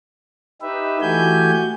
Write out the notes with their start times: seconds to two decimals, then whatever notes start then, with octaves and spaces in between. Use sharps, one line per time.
0.62 D#4 G4 B4 E5
1.02 E3 A3 F#4 G4 G#5 G6